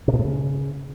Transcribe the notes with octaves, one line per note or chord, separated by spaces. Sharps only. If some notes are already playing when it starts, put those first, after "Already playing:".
C3
B2
A2
C#3